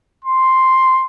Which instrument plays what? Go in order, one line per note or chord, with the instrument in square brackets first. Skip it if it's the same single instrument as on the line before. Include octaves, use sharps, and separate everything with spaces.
[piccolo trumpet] C6